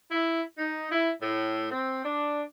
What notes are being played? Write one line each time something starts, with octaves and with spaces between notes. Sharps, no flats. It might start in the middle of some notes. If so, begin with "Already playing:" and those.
E4
D#4
E4
A2
C4
D4